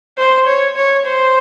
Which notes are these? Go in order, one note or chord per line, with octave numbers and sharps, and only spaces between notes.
C5
C#5
C#5
C5